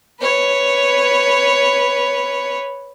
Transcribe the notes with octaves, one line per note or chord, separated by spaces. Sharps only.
B4 C#5